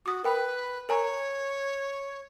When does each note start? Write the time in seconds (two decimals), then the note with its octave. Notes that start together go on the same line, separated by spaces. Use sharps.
0.06 F#4 D6 D#6
0.24 A#4 B4 G5 B5
0.89 A#4 C#5 G#5 A#5